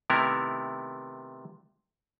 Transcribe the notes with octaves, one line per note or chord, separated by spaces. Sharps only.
C3 D#3 A3 B3 E4 A#4